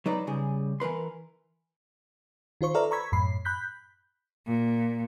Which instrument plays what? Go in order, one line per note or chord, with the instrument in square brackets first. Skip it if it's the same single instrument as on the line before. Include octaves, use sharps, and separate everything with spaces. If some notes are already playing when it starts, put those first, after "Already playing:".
[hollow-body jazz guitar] F#3 D#4 B4 D5
C#3 G3 G#4
E3 A#4 B4 C6
[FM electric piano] D#3 F4 C5 C#6
A4 B4 D5 E5 A#5 F6
A#5 B5 C#6 E6 G#6 B6
F#2 A2 B5 C7
B5 F#6 G6 B6
[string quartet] A#2